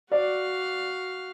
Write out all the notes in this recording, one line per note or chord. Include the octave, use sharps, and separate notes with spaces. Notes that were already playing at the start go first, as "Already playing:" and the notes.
F#4 D5 F5